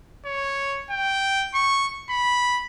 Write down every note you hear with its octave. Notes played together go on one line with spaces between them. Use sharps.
C#5
G5
C#6
B5